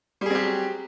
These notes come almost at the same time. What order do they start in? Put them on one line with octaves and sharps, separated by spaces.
G3 G#4 C4 G4 F#3